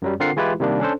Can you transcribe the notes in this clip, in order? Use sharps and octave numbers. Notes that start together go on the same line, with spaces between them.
F#2 F#3 G3
D3 C4 F4 A#4 F#5 C7
E3 G#3 E4 F4 G4 B4
C3 D#3 G3 A#3 D4
C#4 D4 A4 C5